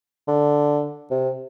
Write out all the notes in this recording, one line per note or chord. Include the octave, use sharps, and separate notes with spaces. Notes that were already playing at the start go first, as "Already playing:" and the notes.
D3
C3